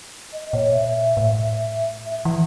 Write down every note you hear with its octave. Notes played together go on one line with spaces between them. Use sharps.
D#5
A#2 C#5
E5
A2
E3